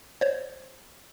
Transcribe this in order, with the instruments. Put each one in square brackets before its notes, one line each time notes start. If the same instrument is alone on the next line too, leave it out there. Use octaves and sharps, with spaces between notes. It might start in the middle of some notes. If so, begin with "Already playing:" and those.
[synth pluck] C5 C#5